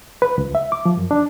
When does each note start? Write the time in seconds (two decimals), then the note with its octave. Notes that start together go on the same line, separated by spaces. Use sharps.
0.22 B4
0.38 C#2
0.55 E5
0.72 D6
0.85 F3
0.97 F#2
1.11 D4